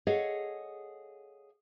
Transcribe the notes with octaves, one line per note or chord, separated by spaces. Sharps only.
G#4 A4 C#5 D#5 F5 F#5